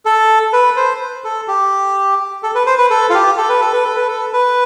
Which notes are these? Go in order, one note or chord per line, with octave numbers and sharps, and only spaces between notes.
A4
B4
C5
A4
G4
A4
B4
C5
B4
A4
F4
G4
A4
B4
A4
B4
A4
B4
A4
B4